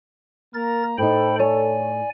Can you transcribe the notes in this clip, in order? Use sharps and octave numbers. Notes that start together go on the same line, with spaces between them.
A#3 A#4 A#5 A6
A2 D#4 A4 C5 G5 B5
C#5 D5 G#5